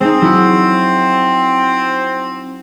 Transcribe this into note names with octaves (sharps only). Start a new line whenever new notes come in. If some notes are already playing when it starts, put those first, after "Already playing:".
G#3 C4 D#4
F#3 E4 F#5